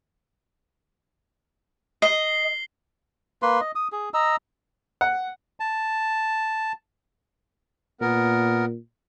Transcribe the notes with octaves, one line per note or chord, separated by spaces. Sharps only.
D#5 C7 G7
A#3 B4 C6
D#5
D#6
G#4
D#5 A#5 E6
F#5
A5
A#2 B3 A#4